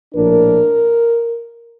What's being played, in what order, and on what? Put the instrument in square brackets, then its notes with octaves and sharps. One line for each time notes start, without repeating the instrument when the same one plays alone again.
[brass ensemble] A#1 A2 F3 A#3 D4 A#4